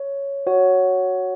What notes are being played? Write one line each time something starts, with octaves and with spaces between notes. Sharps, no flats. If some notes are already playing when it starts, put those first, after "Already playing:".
Already playing: C#5
F#4 C#5 F#5